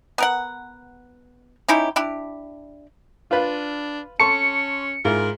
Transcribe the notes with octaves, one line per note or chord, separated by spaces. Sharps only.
B3 A#4 F#5
C#4 D#4 E4 G4
D4 E4 G4
D4 F4 B4 F5
C#4 A4 A5 C6 C#6 C#7
G#2 E4 F4 A#4